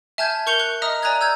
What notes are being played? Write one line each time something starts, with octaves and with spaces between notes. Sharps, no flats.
E5 G#5 A5 F6 G6 G#6
A#4 C#6 G6 C#7 F7 G7
C#6 F#6
D#5 E5 A#5 D#6 F6
D5 G#5 A#5 D#6 F#6 G#6
E6 G6 G#6